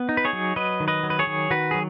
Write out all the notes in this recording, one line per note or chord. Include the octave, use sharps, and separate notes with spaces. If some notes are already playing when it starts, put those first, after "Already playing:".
Already playing: B3
D#4
B4
G#4 C#5
F#3
F#3 B4 D#5
D#3
B4 D#5
F#3
B4
G#4 C#5
D#3
D#3 F#4 B4
F#3 G#4